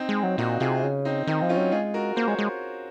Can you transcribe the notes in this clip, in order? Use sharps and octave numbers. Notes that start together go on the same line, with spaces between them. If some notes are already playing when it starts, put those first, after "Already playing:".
Already playing: C4 D#4
G#3
F#3
A#2 D#4 F#4
C3 F4 G#4
C#3
C4 D#4
D#3 C4 D#4
F3
C#4 F4
F#3
G#3 F4 G#4
F#4 A#4
A#3 C5
G#3 C#5
G#3